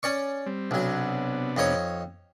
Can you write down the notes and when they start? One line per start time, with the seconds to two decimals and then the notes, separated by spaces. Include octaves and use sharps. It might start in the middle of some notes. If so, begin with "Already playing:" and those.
0.03 C#4 D5 C#6
0.46 G3 C4
0.71 B1 C3 F#3 B3 D4
1.57 F2 D#4 C#5